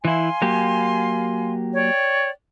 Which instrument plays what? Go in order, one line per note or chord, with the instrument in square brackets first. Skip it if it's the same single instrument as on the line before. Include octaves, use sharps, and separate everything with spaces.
[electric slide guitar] E3 E4 [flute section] F5 G#5 C6
[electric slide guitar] F#3 A#3 G4
[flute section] C#5 D5 G5